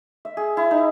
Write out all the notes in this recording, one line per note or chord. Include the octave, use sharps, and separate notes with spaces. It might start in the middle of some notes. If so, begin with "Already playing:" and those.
E5
G#4
E4
D#4